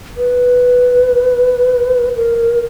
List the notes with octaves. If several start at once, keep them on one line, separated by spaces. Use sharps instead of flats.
B4
A#4